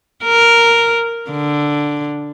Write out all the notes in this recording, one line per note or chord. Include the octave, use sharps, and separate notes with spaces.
A#4
D3